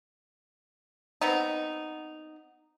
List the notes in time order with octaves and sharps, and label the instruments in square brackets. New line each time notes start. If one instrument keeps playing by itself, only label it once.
[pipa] B3 C4 D#4